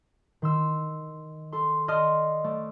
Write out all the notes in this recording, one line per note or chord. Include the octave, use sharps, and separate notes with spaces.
D#3 C6 E6
A4 C6
D5 D#5 A5 C6 D#6 F6
A3 D5